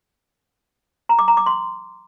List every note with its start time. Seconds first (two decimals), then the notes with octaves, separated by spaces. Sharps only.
1.09 A#5
1.19 D6
1.28 A#5
1.37 D6
1.46 C6